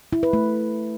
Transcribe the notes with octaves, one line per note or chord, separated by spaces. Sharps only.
E4
B4
A3